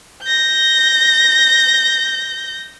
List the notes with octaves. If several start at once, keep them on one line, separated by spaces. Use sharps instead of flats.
G6 A#6